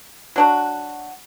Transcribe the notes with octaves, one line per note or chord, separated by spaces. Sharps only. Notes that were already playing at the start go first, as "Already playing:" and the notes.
F#3 D4 F#4